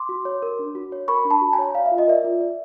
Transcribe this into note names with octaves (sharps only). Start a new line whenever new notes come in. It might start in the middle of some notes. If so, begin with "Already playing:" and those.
Already playing: C6 D6
F#4
C#5
A#4
D4
F#4
C#5
A#4 B5 C#6
D4
A5 B5
F#4
G#5 A#5
C#5
D5 F5
E5
F4
D#5
A#4 D5 E5
F4
D5